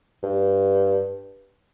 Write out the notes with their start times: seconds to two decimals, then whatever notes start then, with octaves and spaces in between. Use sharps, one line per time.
0.23 G2